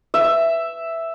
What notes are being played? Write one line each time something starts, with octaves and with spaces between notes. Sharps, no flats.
E5